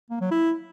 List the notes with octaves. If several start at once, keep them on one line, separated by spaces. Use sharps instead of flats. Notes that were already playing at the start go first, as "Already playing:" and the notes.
A#3
F#3
E4